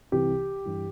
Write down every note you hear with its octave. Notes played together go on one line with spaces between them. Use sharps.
C2 C3 E3 G4
G2 E3